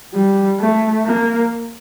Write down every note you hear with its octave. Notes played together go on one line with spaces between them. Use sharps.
G3
A3
A#3